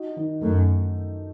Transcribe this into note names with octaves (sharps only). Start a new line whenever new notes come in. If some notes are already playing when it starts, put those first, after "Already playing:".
Already playing: D#4 F#4
D#3
F#2 A3